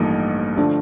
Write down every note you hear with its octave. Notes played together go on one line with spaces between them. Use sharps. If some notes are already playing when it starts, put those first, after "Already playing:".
Already playing: A1 G2 F3 A3 A#3 D#4
D3 F3 A3 D4